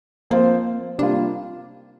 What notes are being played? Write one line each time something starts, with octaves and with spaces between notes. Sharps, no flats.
F3 A#3 C4 F4 C5
C3 G3 A#3 D4 F4